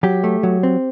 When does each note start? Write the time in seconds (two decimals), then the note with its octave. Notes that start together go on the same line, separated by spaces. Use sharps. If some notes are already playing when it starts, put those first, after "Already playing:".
0.03 F#3 G4
0.24 A3
0.43 F#3
0.63 C4